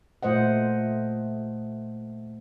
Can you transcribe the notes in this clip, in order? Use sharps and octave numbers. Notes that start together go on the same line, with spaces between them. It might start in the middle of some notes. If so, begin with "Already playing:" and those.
A#2 A3 C5 D#5 F#5